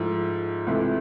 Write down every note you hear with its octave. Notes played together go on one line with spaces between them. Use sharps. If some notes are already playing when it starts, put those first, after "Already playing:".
Already playing: G#2 F3 A3 E4
C#2 C3 E3 A3